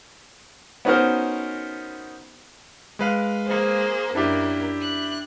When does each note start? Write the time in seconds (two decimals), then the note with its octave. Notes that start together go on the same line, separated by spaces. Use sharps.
0.85 B3 C#4 D#4 F#4 A#4 C5
2.99 G#3 B4 F5
3.45 A#3 G#4 C5
4.15 F#2 A#3 D4 E4 G4 A#4
4.81 F#6